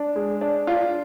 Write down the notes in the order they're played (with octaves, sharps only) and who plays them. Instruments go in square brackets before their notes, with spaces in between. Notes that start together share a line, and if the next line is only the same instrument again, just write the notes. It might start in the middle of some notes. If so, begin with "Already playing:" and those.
Already playing: [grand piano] D4
G#3
D4
D4 F4